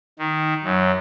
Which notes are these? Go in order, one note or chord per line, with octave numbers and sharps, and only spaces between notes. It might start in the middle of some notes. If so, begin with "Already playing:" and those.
D#3
F#2